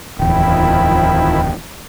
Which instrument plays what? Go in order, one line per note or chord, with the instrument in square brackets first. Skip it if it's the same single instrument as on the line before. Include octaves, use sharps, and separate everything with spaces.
[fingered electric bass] D1 E2 [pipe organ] D#3 F3 E4 [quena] G5